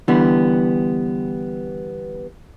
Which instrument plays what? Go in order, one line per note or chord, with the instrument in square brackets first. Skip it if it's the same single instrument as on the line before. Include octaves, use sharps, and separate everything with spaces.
[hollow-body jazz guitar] D3 E3 G3 B3